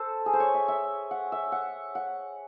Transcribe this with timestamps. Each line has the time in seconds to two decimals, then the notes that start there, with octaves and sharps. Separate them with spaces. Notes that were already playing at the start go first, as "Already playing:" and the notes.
Already playing: A4 C5
0.26 G#4
0.33 C5
0.40 C#5
0.54 E5
0.68 E5
1.11 F#5
1.32 E5
1.52 F#5
1.95 F#5